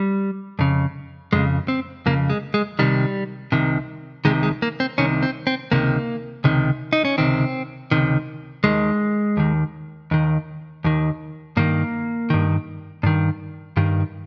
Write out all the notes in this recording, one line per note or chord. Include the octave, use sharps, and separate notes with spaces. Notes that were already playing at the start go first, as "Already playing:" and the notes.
Already playing: G3
F2 C#3
F2 C#3 G#3
C4
F2 C#3 A#3
G#3
G#3
C2 C3 D#3 G3
C2 C3 D#3
C2 C3 D#3 G#3
G#3
A#3
C4
C2 C3 D#3 C#4
C4
C4
C#2 C3 D#3 A#3
C#2 C3 D#3
D#4
C#4
C#2 C3 D#3 C4
C#2 C3 D#3
D#2 D#3 G#3
D#2 D#3
D#2 D#3
D#2 D#3
G2 D#3 A#3
G2 D#3
G2 D#3
G2 D#3